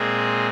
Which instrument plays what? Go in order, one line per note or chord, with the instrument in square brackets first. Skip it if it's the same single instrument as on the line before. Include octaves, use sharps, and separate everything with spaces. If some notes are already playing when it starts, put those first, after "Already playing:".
Already playing: [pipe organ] A#2 G#3 C4 G#4